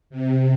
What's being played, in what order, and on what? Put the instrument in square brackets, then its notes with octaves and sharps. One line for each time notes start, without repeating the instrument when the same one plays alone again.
[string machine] C3